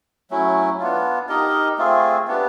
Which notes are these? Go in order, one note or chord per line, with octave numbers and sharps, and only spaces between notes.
F#3 A3 C#4 E4
B3 D4 F4
D#4 G4 A#4 D#5
A3 C4 F4 G#4
B3 D4 G4 B4